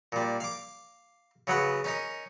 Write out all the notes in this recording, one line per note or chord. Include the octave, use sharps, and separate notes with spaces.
A#2 G3
F5 D6
C#3 F#3 B3 B4
C#4 D#4 A#4